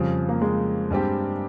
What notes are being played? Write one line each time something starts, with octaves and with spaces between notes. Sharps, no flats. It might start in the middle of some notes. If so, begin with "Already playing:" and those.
Already playing: F2 C#3 F3 G3
A#3
G#3
G2 G3 C4 G4